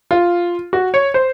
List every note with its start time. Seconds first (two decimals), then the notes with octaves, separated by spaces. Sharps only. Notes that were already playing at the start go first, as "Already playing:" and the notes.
0.11 F4
0.73 F#4
0.94 C#5
1.14 C5